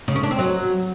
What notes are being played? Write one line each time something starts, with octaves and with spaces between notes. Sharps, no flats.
C#3
C#4
D4
C4
F#3